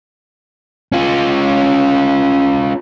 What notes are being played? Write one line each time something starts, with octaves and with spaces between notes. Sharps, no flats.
C#4 F4